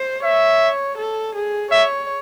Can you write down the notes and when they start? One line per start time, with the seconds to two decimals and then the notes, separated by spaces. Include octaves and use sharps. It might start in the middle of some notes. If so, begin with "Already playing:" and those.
Already playing: C5
0.24 C#5 E5
0.98 A4
1.35 G#4
1.72 C#5 E5